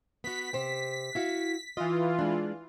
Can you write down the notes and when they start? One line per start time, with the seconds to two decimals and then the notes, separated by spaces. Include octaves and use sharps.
0.24 B3 F#4 B6
0.53 C3 C5 G5
1.15 E4 F#4 F5
1.77 E3 F4 D#5
2.19 G#3 D4